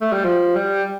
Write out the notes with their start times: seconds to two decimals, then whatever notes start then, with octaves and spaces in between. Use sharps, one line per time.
0.01 A3
0.13 G3
0.24 F3
0.55 G3